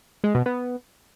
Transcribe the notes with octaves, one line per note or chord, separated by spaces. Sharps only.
G#3
B2
B3